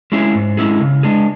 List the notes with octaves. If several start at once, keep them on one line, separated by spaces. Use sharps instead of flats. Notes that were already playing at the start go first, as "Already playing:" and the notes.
G#3 C#4 E4 G#4
G#2
G#3 C#4 E4 G#4
C#3
G#3 D4 G#4